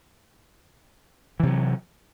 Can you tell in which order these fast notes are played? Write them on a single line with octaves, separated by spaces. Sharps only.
E3 C3 F#3